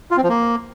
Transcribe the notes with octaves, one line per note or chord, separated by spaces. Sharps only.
F4
C4
F3
A#3